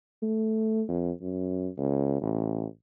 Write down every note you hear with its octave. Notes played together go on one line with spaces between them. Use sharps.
A3
F2
F#2
C#2
A1